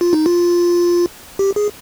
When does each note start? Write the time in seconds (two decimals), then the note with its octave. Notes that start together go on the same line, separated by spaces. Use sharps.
0.01 F4
0.13 D#4
0.26 F4
1.39 G4
1.56 G#4